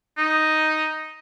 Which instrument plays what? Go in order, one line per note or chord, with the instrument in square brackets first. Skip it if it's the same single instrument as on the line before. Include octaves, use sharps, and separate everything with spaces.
[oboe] D#4